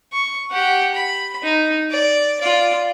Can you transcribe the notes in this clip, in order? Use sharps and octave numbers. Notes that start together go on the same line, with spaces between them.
C#6
G4 F#5
B5
D#4
D5
F4 D5